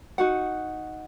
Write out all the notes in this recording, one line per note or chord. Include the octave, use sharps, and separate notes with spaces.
D#4 F#4 F#5